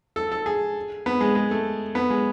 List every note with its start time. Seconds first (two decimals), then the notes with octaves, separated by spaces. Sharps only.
0.16 A4
0.32 A4
0.46 G#4
1.06 B3
1.21 G#3
1.35 G#3
1.51 A3
1.95 B3
2.10 G#3